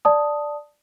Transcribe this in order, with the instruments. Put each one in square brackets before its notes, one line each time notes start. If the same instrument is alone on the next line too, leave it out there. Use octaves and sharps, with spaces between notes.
[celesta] D5 A5 D#6